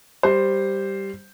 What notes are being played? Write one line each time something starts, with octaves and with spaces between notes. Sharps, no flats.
G3 C5